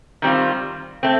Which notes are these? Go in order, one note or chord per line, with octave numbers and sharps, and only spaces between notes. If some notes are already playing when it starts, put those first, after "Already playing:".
D#3 G3 C4 F4
A3 C4